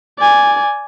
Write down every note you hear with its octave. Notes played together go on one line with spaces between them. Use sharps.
D5 G#5